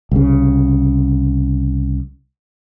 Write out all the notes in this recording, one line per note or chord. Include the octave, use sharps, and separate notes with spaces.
C2 C#3